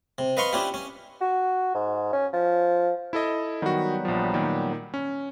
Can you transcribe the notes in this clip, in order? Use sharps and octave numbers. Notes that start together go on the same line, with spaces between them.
C3
B4 D#5 F5 C6 C#6
C#4 D4 E4 F4 G4
C#4
F#4
G#2
C#4
F3
E4 A4 D#5
D#3 F#3 G3 B3 F#4
A#1 F3
A#2 D#3
C#4